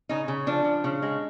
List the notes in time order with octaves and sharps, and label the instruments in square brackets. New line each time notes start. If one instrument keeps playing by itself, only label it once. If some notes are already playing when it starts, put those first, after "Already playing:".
[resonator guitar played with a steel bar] C#3 D#4
C#3
F3 D4
F3
C#3
G#3